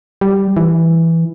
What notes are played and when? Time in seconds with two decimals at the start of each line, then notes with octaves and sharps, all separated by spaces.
0.21 G3
0.57 E3